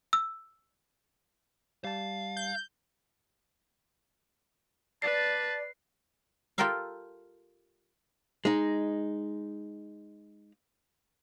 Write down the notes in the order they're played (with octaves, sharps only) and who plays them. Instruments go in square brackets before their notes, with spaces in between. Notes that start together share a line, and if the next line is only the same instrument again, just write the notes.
[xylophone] E6
[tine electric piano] G3 A5 [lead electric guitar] F5
[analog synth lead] G6
[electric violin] B4 [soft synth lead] D5 [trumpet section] A5 [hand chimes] C7
[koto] F4 G4 A4 A#4 E5 F5
[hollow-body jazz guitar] G#3 D#4